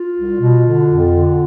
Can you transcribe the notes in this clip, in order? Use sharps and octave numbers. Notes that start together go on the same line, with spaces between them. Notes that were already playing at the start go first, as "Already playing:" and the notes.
Already playing: F4
C2
B2
D3
F2
D3